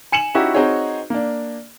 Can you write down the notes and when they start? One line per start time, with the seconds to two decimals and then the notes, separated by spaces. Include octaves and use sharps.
0.12 G#5 C#7 E7 F#7
0.34 C#4 D#4 E4 F#4 G4
0.54 C4 D#4 F#4 G#4 C#5
1.10 A#3 D4